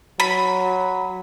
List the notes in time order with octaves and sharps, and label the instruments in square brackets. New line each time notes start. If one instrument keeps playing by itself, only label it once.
[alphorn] F#3 [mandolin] B5